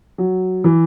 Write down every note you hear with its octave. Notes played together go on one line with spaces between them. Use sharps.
F#3
E3